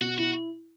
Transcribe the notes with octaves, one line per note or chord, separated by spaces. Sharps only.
B2 F#4
E4 F#4